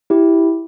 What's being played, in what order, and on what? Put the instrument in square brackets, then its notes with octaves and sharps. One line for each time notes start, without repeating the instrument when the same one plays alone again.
[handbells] E4 G4